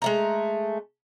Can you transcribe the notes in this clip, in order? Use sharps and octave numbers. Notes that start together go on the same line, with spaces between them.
G#3 A3 A#5